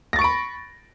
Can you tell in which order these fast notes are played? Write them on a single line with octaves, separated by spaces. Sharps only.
A#6 A6 C#6 D7 B5